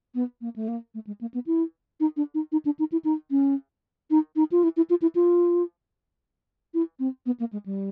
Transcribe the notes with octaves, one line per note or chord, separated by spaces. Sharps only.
B3
A#3
A3
A#3
A3
G#3
A#3
B3
E4
D#4
D4
D#4
D#4
D4
D#4
E4
D#4
C#4
D#4
D#4
F4
E4
E4
F4
E4
F4
E4
C4
B3
A#3
G#3
G3